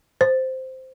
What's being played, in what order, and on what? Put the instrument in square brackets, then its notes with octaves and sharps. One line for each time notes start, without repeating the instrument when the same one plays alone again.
[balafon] C5